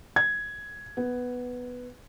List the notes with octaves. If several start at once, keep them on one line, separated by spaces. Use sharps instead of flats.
G#6
B3